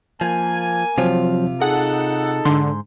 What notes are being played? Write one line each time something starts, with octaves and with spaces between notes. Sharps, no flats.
F3 A#3 G#5
C3 F3 F#3 C4 F4
D#4 G#4 A4 F#5
G#2 D3 C6